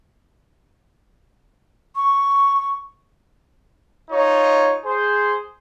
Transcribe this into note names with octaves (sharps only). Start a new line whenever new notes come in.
C#6
D#4 F4 C#5
G#4 C5